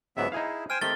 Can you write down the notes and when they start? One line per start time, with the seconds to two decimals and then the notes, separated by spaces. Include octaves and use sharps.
0.17 C#2 G#2 F#3 B3 E5
0.32 D#4 E4 G#4 F5
0.70 C5 G5 G#5 F6
0.81 D#3 A3 C4 G4 A6 G7